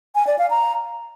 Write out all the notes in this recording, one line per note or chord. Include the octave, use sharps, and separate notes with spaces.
G#5
D5
F5
A#5